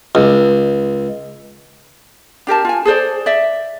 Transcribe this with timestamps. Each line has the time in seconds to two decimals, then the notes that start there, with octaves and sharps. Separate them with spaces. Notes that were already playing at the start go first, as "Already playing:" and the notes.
0.15 C#2
2.47 D4 G4 A#4 A5
2.65 F4 G#5
2.85 G#4 A4 C5 D5
3.26 D5 E5